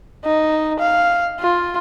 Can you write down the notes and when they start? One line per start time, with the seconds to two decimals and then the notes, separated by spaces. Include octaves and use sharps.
0.24 D#4
0.80 F5
1.40 F4